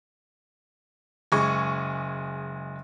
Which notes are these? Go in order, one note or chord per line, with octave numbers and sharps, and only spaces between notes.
F#1 G#3 G#4 C#6